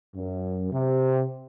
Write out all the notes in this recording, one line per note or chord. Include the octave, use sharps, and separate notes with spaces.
F#2
C3